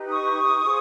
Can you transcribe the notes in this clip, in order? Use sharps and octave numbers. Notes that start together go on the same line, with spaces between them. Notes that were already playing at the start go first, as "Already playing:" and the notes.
Already playing: D#4 G4 B4
C#6 D#6
F4 G#4 C5